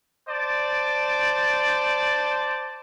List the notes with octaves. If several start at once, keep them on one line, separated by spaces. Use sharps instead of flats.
C5 D5 A5 D6